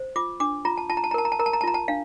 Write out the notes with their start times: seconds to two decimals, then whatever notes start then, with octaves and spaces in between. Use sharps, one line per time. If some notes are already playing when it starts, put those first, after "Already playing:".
Already playing: C5
0.16 F4 D6
0.40 D4 D6
0.65 F4 A#5
0.77 A5
0.89 F4 A5
0.97 A#5
1.04 A5
1.11 A#5
1.14 A#4 A5
1.25 A#5
1.32 A5
1.39 A#4 A#5
1.46 A5
1.53 A#5
1.61 A5
1.63 F4 A#5
1.74 A5
1.88 D4 F5